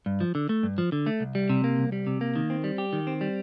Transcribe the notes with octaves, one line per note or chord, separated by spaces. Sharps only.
G2
F3
D3
A3
G2
F3
D3
A3
C2
G3
C3
A#3
C2
G3
C3
A#3
D#3
C4
G3
G4
D#3
C4
G3